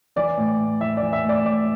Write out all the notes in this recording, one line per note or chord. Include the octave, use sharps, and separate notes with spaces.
E3 D5
A2
A2
E3 E5
E3 D5
E5
A2 D5
A2 D5